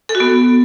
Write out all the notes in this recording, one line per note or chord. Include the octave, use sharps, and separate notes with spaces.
A4
F#4
B3